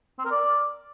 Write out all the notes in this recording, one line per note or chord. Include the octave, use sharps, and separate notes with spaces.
C4
A#4
D5